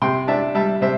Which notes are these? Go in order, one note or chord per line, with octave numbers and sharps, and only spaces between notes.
C3 G5 C6
D4 E5 A5
G3 E5 A5
C3 C5 E5